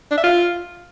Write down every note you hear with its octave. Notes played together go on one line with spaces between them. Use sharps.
D4
E5
F4